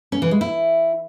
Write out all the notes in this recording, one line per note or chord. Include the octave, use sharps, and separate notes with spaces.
C#4
E3
G#3
E4